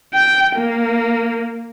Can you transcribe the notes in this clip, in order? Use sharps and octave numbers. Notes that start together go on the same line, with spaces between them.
G5
A#3